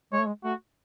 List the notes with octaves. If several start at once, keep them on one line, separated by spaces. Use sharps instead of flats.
G#3 C#5
A3
G#3
A3 F#4